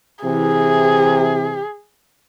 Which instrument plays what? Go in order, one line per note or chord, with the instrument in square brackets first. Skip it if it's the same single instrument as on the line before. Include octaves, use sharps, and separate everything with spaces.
[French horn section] C3 E3 [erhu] G#4